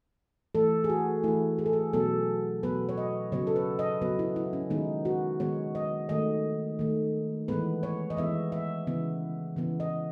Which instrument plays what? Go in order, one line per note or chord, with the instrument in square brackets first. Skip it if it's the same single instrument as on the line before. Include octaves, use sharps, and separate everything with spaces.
[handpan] E3 A3 A4
G#4
F#4
E3 A3 E4
G#4
A4
G#4
B2 F#3 B3 A4
B2 F#3 B3 B4
C#5
D#5
C#3 F#3 B3 C#5
A4
B4
D#5
C#3 F#3 B3 B4
E4
E4
C#4
D#3 G#3 B3 D#4
F#4
D#3 G#3 B3 C#5
D#5
D#3 A3 D#5
D#3 A3
E3 G#3 B3 B4
C#5
D#5
E3 G#3 B3 E5
E5
C#3 E3 B3
C#3 E3 B3
D#5